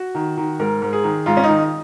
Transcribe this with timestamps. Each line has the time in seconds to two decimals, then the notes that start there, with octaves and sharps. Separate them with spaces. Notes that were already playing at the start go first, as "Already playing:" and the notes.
Already playing: F#4
0.15 D#3
0.37 D#3
0.59 G#2 A#4
0.82 G#2
0.93 G#4
1.04 D#3
1.26 G#2 F4
1.37 C#4
1.44 D#4
1.49 D#3